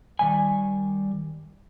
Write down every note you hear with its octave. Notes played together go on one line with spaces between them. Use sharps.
D#3 G3 G#5